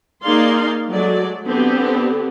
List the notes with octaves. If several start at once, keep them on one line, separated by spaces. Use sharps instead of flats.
A#3 D#4 G#4 D5 F5 C6
F#3 G#3 A3 D5
D3 B3 C4 G4